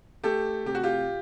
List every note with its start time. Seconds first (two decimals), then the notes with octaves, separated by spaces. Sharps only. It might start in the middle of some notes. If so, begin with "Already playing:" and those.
0.24 A3 G4 A4
0.66 C3 G4
0.75 F#4
0.83 F4 G4